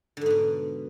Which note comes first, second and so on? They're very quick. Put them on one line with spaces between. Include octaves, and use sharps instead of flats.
D3 G#2 B3 B2